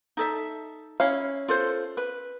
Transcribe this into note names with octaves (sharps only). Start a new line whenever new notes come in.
D#4 A4 E5
C#4 E4 F5
F4 A4 C5
B4